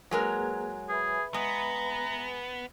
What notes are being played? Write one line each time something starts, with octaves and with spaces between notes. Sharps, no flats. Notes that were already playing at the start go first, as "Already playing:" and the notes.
F#3 G#3 A#3 G#4 A#4 B4
G#4 B4 E5 B5
G#3 B3 A#5